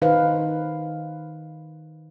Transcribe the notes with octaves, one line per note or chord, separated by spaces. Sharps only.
D#3 D#4 B4 C5 F5